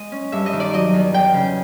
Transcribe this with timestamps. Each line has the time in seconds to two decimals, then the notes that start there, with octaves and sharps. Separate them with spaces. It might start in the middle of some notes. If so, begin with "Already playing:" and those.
Already playing: G#3 D#5
0.12 C#4
0.32 G2 E5
0.46 D#5
0.53 D#3
0.60 D5
0.73 F#3 D#5
0.94 E2
1.13 E2 G5
1.34 C#3